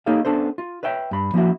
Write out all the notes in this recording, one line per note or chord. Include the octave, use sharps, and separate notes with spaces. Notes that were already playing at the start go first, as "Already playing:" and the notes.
A#3 D#4 G4 A4 C#5 F5
B3 C#4 D4 A4 C5
F4
B4 C#5 E5 G5
G2 B5
F3 A#3 C#4 E4 F#4 E5